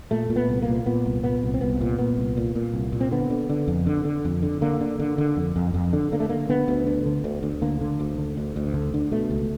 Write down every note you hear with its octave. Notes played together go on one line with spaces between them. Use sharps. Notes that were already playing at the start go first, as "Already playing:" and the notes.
A#2 A3
A#2
B3
C2
A#3
A#2
A#2 B3
C2
A#2 B3
C2
C4
C2 B3
A#2
A#2 B3
C2
A#2
A#2
C2
A#2
C4
D3 B3
D3
D3
F2
D3
D3
F2
D3
D3 A#3
D3
D3
D3
F2
F2
F2
D3
D3 A#3
A3
D3 A#3
D3 B3
D2
D3
D3
D2
D2
D3 A#3
D3
D2
D3
D2
D2
D3
D3
B2 A3
C#2